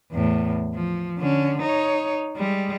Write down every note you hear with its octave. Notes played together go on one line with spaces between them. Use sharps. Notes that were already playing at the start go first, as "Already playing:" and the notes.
E2 A2
F3
D3 C#4
D#4 C#5
G3 G#3